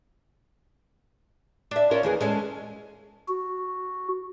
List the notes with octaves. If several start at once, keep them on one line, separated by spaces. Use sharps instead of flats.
D4 E5
C#4 F4 A#4
D#2 E3 G#4
G#3 C#4 A4
F#4